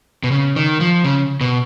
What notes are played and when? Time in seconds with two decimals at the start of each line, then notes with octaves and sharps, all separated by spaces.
0.24 B2
0.31 C#3
0.56 D#3
0.80 F3
1.04 C#3
1.41 B2